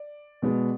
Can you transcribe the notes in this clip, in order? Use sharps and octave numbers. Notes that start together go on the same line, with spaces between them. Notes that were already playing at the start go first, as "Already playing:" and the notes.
Already playing: D5
B2 G#3 B3